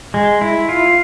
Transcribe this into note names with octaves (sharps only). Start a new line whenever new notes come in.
G#3
E4
F4